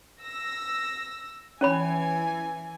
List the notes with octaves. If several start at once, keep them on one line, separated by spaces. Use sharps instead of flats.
E6 A#6
E3 C#4 C#5 G#5 B5